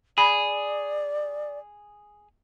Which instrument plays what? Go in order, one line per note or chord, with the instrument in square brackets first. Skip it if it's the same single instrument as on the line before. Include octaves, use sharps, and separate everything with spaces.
[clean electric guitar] G#4 [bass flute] D5 [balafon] B5